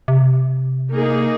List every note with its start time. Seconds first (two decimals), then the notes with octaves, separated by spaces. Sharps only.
0.08 C3
0.92 A#3 D#4 G#4